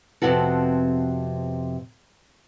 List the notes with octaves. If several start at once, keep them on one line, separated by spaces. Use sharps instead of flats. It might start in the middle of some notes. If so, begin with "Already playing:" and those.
F2 C3 B3 F#4 A4